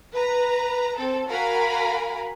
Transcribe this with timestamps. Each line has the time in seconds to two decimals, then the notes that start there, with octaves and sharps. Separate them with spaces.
0.13 B4 A#5
0.97 C4 A4
1.27 F#4 A#4 F5 G#5 A#5 B5